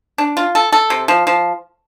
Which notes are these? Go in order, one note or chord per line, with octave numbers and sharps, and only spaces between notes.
D4
F4
A4
A4
C3
F3
F3